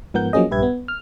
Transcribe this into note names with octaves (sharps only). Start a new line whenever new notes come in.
G#2 F3 B3 A#4 F#5 G6
F3 F#3 A#3 C#4 G#4 D#5
A#1 G2 G4 B4 E5 G#6
B3
F6